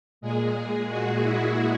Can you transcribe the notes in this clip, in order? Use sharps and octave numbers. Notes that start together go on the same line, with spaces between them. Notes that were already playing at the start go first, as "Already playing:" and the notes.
A#2 G#3 G#4
F#4
E4